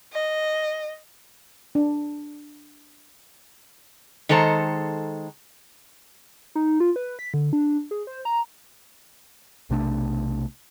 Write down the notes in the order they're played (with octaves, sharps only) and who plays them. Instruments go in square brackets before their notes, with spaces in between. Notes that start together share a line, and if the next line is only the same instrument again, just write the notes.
[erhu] D#5
[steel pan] D4
[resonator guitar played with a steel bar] D#3 G#3 A4 C5 A#5
[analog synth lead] D#4
F4
B4
B6
D3
D4
G#4
C5
A#5
[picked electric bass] B1 C3 A3 D4